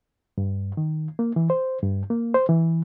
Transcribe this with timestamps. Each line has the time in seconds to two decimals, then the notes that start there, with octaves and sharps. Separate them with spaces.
0.38 G2
0.77 D#3
1.19 A#3
1.36 E3
1.50 C5
1.82 G2
2.10 A#3
2.34 C5
2.49 E3